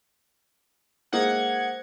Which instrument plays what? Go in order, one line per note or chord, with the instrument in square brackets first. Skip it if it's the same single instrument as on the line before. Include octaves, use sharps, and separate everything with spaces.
[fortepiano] G#3 A#3 D#4 [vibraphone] C5 [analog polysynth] F#5 G#6